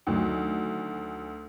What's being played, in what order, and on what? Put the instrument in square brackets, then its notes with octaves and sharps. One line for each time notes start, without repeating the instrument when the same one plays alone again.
[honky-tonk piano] D2 [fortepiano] D#3 F#3